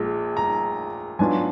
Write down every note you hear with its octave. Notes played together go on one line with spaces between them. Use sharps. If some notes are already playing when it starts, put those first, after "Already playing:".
Already playing: A#1 A#2 G#3
A#5
G#2 F#3 B3 D4 F4 G#5